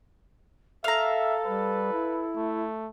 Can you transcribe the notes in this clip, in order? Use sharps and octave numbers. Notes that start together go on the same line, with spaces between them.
A4 E5 F5 A#5
G3 B4
E4
A3